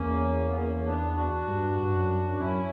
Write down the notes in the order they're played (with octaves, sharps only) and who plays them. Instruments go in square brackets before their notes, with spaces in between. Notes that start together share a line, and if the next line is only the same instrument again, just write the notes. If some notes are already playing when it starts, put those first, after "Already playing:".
Already playing: [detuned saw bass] E2 [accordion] A#3 C#4
[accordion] B3
A#3 C#4
C#4
B3 D4
D4 F#4
[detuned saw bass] G2
G2
F#2
[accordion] D4
[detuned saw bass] F#2 [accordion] C#4 E4